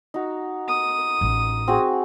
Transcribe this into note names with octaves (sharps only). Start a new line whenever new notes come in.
D#4 F#4
D#6
A1
C4 F#4 G#4